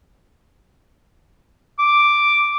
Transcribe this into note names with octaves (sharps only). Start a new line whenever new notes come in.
D6